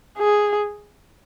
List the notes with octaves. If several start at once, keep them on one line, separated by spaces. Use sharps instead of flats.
G#4